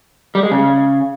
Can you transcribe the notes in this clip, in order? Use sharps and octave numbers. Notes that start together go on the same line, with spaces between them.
G3
G#3
C#3